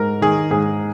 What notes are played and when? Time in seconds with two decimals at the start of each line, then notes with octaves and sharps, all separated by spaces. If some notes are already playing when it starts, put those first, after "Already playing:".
Already playing: G#2 A#4
0.21 D#3 G#4
0.50 G#2 G#4